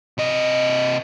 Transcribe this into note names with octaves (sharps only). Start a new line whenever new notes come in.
C3 D#5